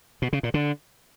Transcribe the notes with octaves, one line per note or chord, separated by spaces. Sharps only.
B2
C#3
A#2
D3